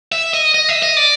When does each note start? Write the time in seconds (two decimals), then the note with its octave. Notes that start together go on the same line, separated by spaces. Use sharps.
0.12 E5
0.34 D#5
0.54 D#5
0.69 E5
0.82 D#5
0.97 D5